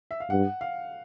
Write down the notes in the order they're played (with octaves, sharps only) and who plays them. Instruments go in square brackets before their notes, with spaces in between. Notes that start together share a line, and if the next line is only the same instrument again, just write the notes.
[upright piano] E5
F5
[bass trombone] G2 [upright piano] F#5
[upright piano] F5